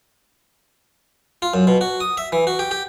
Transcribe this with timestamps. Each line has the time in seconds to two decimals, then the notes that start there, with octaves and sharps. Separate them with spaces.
1.42 F4
1.54 F#2
1.67 B2
1.81 F#4
2.00 D#6
2.17 E5
2.32 E3
2.47 F#4
2.59 G4
2.71 G4